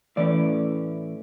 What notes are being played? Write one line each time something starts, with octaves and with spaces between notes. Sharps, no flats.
A2 E3 A3 C#4 D5